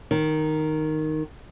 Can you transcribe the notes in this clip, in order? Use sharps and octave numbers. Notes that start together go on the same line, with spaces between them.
D#3